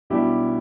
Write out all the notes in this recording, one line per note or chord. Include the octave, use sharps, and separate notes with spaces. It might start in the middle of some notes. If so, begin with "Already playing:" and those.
B1 B2 G3 D4 E4 G4